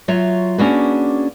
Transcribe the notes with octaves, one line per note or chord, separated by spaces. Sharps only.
F#3 F4 C#5 E5
A#3 C#4 D4 F#4 G#4 B4